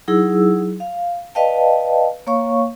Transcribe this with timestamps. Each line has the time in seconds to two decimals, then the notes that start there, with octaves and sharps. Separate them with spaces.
0.08 F#3 D#4 E4 G#4 E6
0.80 F5
1.35 B4 D5 D#5 F5 G5 A5
2.27 A#3 C#5 F5 C#6